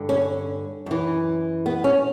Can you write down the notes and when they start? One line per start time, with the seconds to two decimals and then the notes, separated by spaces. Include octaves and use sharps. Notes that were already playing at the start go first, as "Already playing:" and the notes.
Already playing: G2 D3
0.09 C#4
0.86 F#2 E3
1.66 B3
1.84 C#4